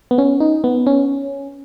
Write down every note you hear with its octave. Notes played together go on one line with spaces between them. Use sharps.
B3
C#4
D#4
B3
C#4